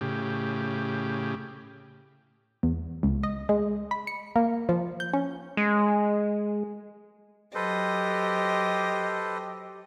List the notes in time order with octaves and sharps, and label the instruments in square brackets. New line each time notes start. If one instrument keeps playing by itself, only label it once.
[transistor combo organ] A2 C#3 G4
[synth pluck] E2
C#2
D#5
G#3
B5
C#7
A#3
F3
G6
C#4
[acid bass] G#3
[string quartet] F#3 D#5 [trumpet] G4 [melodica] A4 B4 C5